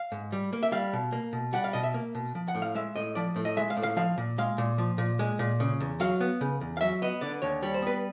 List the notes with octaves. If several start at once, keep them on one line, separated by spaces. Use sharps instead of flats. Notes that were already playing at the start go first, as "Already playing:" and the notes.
Already playing: F5
G#2
G3
A#3
E5
G3 F5
B2
A#3
B2
G3 F#5
F5
B2 D#5
E5
A#3
B2
F3
F#5
A2
F5
G#3 E5
A2 D#5
F3 D5
A2
D#5
G#3 E5
F5
A2
F5
F3 F5
A#2
G#3 F5
A#2
F3
A#2
G#3
A#2
C#3
E2
F#3 F5
B3
C#3
E2
F5
F#3 E5
B3 D#5
D3 D5
D#2 C#5
G3 C#5
C5
B3 B4